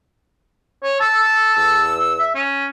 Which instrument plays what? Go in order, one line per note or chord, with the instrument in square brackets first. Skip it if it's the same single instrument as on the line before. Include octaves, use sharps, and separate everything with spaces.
[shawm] C#5
[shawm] A5 [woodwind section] E6
[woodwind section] E2 E6
[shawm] E5
C#4